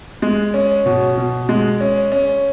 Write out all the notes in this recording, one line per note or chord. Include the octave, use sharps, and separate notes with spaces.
G#3
C#4
B2
B2
G#3
C#4
C#4